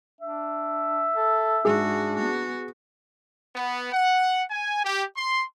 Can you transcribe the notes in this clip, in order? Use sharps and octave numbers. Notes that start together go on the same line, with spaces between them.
D4 E5
A4
G#2 D4 F#4 G#4
B3 F#4
B3
F#5
G#5
G4
C6